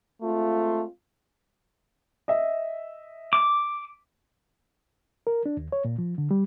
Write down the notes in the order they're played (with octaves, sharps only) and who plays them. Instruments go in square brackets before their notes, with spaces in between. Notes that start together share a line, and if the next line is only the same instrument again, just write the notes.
[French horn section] G#3 C4 F4 [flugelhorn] A3
[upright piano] D#5 E5
[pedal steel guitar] D6
[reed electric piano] A#4
D4
D#2
C#5
A#2
F3
D3
G3